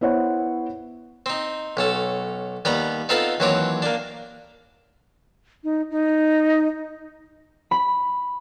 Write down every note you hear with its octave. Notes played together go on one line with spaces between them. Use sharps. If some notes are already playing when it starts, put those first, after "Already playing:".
B3 E4 C5 C#5 F#5
C4 D#4
B1 C#4 A4
D#2 G3 B3 B4 A#5
B3 C4 D#4 F4 A4 B4
D#2 E3 F#3 C4 C#5 D6
A#3 D4
D#4
D#4
B5